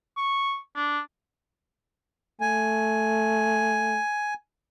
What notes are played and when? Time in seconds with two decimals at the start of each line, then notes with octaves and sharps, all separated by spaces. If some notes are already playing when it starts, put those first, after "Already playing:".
0.17 C#6
0.75 D4
2.41 A3 G#5